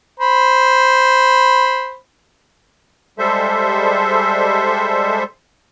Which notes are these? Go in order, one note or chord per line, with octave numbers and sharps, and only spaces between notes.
C5 B5
G3 G#3 A4 C5 E5